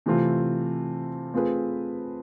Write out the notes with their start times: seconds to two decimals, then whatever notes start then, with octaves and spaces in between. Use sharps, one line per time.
0.06 C3 E3 A3 C4 F4
1.34 A3 C4 F4 G#4 B4